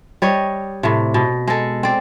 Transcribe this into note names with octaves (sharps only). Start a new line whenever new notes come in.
G3 C#5 D#5
A2 C3
B2
G#3 A4
C4 D5